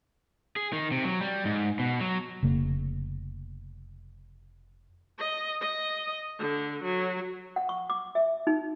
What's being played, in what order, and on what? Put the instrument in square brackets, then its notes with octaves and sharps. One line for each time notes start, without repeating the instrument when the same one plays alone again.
[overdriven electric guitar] G#4
D#3
C3
F#3
G3
G#2
B2
F#3
[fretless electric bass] F1 C#3 A#3
[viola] D#5
D#5
D3
F#3
[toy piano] F#5
C#6
D6
E5
D#4